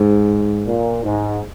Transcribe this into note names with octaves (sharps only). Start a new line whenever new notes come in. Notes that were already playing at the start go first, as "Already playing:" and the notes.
Already playing: G#2
A#2
G#2